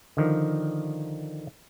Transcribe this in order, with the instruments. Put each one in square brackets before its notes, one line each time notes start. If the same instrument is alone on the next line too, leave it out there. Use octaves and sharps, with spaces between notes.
[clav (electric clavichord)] D3 D#3 F3